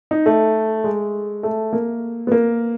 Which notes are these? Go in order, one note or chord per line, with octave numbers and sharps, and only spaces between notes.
D#4
A3
G#3
A3
A#3
B3
A#3